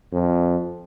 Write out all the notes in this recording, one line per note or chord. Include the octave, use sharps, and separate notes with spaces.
F2